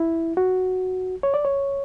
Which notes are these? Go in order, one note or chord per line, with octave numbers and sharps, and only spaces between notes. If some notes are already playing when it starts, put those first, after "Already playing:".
Already playing: E4
F#4
C#5
D5
C#5